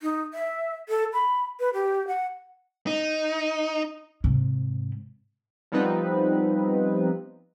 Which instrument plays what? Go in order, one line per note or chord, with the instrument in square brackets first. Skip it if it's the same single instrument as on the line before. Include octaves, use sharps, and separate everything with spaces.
[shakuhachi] D#4
E5
A4
B5
B4
G4
F#5
[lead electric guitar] D#4
[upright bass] G#2 C3
[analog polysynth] F3 G3 B3 C4 D#4 B4